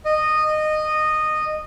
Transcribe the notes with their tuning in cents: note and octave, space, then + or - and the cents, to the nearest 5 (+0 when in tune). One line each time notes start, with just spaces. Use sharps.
D#5 -15